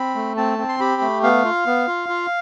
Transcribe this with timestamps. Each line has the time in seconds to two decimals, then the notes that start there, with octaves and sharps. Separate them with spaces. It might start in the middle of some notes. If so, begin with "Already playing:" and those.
Already playing: C4 B5
0.15 A3
0.37 C4 A5
0.59 C4
0.69 C6
0.80 G4 B5
1.01 A3
1.23 B3 F5
1.44 F4
1.66 B3
1.88 F4
2.09 F4